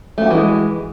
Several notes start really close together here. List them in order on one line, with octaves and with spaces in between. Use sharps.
A3 F#4 G4 E3 G#3